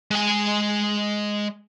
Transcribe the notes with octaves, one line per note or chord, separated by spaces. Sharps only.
G#3 G#5